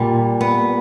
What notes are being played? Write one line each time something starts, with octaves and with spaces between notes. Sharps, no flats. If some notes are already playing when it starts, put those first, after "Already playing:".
Already playing: A#2 G3
B3